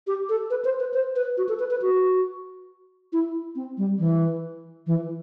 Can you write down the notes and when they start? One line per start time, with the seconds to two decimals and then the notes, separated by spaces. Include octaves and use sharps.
0.07 G4
0.29 A4
0.50 B4
0.65 C5
0.80 B4
0.94 C5
1.16 B4
1.37 F#4
1.49 A4
1.59 B4
1.71 B4
1.82 F#4
3.13 E4
3.56 C4
3.78 G3
3.99 E3
4.87 E3